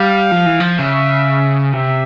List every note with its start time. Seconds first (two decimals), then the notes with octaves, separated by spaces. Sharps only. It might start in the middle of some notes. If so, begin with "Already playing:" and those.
Already playing: G3 F5
0.32 F3
0.46 E3
0.60 F3
0.79 C#3 E5
1.73 C3 E5